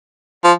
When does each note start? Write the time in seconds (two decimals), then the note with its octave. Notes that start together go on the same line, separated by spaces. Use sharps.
0.44 F3